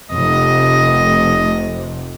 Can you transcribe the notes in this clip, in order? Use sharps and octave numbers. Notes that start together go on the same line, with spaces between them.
F1 C3 D#5